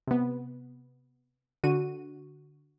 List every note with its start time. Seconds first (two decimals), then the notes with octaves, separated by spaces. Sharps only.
0.07 C3 B3
1.64 D3 F#4 D#7